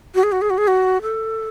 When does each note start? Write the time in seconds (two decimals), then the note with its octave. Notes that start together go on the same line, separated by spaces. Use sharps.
0.15 F#4
0.23 G#4
0.32 F#4
0.42 G#4
0.50 F#4
0.58 G#4
0.68 F#4
1.02 A4